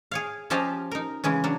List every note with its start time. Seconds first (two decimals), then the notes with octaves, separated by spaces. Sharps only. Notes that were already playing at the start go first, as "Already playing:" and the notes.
0.11 G#4 C#5 F5
0.50 F3 C#4 G4 D#5 F5 A5
0.91 D#4 A#4
1.24 C#3 E3 G#3 C#4
1.44 F#3 D4